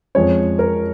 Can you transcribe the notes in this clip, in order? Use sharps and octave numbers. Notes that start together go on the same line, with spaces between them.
F2 F3 G#3 C#4 C#5
A#4